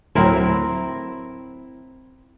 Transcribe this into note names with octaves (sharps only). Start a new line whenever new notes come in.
D2 A2 F#3 C4 E4 A#4